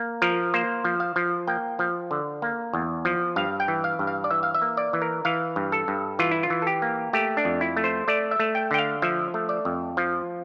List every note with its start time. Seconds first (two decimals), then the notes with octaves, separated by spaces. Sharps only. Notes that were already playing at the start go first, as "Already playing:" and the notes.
Already playing: A#3
0.22 F3 A#4
0.54 A#3 C5
0.84 F3
1.00 F5
1.16 F3
1.47 A#3 G5
1.79 F3
2.11 D3
2.42 A#3
2.73 E2
3.05 F3
3.36 G2 F5
3.60 G5
3.68 E3
3.84 F5
3.99 G2
4.07 F5
4.24 D5
4.31 E3 E5
4.43 F5
4.55 E5
4.62 A#3
4.77 D5
4.93 E3
5.02 A#4
5.25 E3 F5
5.56 G2
5.72 A4
5.88 G2
6.19 E3 F4
6.31 E4
6.43 F4
6.50 E3
6.62 A4
6.67 G4
6.82 A#3
7.13 A3 G4
7.37 D4
7.45 F2
7.61 E4
7.77 A3
7.84 C5
8.08 A3 D5
8.31 E5
8.40 A3
8.55 G5
8.71 D3 G5
8.79 F5
9.02 F3 E5
9.34 A3
9.49 D5
9.65 F2
9.97 F3